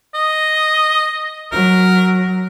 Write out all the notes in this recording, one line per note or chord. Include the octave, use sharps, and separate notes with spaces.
D#5
F#3 A#4